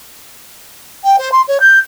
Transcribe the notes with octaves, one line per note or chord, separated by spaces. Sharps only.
G5
C5
C6
C#5
G6